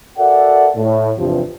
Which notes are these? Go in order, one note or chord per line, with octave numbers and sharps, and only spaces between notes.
F#4 A4 A#4 D5 E5 F#5
A2
E2 G2 C3 F3